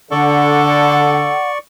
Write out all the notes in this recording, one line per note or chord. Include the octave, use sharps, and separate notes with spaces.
D3 A4 D5 F#5 C#6